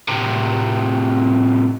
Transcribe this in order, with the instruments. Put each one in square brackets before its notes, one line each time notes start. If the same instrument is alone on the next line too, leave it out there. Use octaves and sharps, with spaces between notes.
[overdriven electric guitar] A2 C3